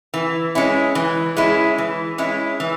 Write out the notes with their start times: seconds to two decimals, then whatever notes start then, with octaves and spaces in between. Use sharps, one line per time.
0.14 E3
0.55 G#3 C#4 E4
0.95 E3
1.37 G#3 C#4 E4
1.78 E3
2.18 G#3 C#4 E4
2.60 E3